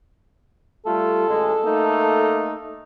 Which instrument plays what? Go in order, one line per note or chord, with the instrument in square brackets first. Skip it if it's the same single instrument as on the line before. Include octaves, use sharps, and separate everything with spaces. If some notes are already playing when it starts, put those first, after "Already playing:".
[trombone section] G3 A3 F4 [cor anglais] A4
[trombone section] A1 G#3
A3 A#3 D#4